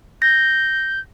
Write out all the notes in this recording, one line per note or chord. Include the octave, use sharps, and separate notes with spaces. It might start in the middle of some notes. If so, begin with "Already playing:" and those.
G6 A#6